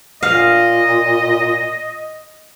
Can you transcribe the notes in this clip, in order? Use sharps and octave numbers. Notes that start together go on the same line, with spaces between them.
A#2 D#5 F5